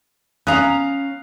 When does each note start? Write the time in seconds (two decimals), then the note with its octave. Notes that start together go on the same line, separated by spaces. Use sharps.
0.47 C#4 F5 A#5 D#6 F#6